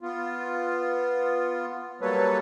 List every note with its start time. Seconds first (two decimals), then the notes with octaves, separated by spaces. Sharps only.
0.01 B3 F4
2.01 F#3 G3 A#3 A4 B4 C#5